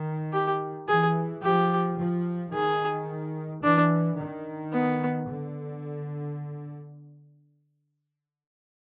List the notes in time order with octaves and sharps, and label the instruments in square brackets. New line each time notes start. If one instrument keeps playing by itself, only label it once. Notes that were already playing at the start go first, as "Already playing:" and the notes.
Already playing: [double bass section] D#3
[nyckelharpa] G4
[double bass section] E3 [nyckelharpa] G#4
[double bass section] F3 [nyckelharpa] G4
[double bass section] F3
[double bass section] D#3 [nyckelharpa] G#4
[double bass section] E3 [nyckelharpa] D4
[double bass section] D#3
[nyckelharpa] B3
[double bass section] D3